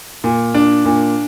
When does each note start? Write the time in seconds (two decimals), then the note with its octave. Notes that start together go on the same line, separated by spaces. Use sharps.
0.24 A#2
0.54 D4
0.85 A#2